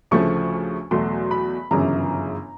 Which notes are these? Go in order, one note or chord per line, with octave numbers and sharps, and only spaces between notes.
D2 C#3 F3 A3 C#6
E2 B2 F#3 A3 C6
B5
G1 F#2 C#3 E3 A#5